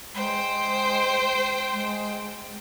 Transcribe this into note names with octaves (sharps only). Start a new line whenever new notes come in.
G#3 C5 G5
G#3